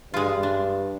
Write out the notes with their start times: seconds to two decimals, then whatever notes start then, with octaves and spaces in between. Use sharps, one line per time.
0.14 G2 G#3 F4
0.43 D4